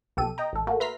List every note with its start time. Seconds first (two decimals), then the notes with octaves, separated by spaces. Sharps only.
0.17 B1 B2 G4 A4 D#7
0.38 D#5 G5 A#5
0.53 A1 A4
0.67 A3 A#3 F#4
0.80 B4 E5 A#5 C6 F6 B6